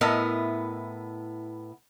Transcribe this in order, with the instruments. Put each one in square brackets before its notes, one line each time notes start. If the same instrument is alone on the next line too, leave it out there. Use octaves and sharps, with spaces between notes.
[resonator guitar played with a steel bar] A2 B3 E4 A#4 D#5